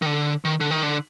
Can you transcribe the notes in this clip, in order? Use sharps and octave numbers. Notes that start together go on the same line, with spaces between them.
D#3
D3
D#3
D3
D#3
D3